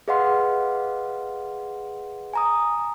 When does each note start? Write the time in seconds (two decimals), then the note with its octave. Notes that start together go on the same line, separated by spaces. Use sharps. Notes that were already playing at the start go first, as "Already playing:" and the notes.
0.08 G#4 B4 D#5 F5 F#5 C6
2.33 G#5 A#5 D#6